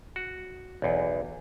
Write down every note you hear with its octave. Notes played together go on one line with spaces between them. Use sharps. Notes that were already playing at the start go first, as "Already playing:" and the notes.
F#4
B1 E2